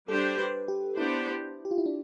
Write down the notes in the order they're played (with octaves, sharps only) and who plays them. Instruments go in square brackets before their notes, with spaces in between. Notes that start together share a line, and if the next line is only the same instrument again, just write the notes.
[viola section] G3 D4 G4 C5 [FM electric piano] A4
[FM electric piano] B4
G4
[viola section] B3 D4 G4 C5 [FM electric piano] E4
[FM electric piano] G4
F4
E4
D4